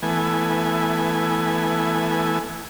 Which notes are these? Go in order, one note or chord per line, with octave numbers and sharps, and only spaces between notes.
E3 A3 B3 G#5